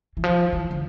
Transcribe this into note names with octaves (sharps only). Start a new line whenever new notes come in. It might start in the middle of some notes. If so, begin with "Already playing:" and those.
E3
F3
E3
D3